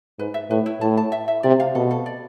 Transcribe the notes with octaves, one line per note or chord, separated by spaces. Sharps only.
G#2 B4
E5
A2 B4
E4
A2 A5
A5
E5
E5
C3 D5
F5
B2 A4
A4
D5